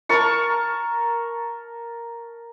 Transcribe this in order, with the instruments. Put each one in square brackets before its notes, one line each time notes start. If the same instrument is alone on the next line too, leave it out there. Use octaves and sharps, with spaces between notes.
[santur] A#4 A5 C#6